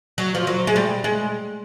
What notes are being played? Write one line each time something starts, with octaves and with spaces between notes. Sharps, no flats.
F#3
F3
F#3
G#3
G3
G#3